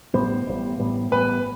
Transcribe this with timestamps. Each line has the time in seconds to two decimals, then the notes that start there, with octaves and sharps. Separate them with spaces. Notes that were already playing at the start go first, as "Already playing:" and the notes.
0.14 A1 A2 G3 B3 C5
0.47 A1 A2 G3 B3
0.79 A1 A2 G3 B3
1.11 A1 A2 G3 B3 B4